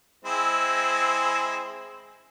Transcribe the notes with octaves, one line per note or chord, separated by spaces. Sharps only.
G#3 C4 E4